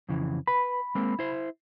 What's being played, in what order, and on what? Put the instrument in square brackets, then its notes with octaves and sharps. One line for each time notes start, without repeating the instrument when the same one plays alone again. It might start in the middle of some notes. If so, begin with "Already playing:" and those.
[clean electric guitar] F2 C#3 E3
[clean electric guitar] B4 [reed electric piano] B5
[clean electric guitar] G#3 A#3 C4
E4 C5